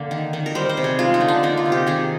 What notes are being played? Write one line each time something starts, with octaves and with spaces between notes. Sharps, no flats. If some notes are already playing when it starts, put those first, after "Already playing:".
Already playing: D3 A#3 D5
D#3
D#3
A#4
G3 C5
C5
C3
G#4
G#3 F4
D#4
D3
D4
A#3 D#4
F4
C3
G4
D#3 G#4